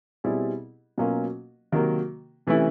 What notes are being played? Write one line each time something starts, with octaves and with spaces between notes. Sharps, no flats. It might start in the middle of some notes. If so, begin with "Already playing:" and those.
B2 G3 C4 E4 G#4
B2 F#3 A#3 C#4 F4
C3 D#3 F#3 A#3
C3 E3 A3 C#4 E4